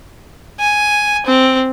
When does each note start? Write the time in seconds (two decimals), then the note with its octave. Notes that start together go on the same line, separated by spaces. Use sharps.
0.60 G#5
1.26 C4